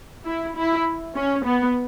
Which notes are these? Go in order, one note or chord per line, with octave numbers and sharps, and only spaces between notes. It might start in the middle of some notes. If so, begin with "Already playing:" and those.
E4
E4
C#4
B3